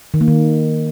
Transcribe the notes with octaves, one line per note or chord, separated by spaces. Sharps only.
D#3
A#3
D#3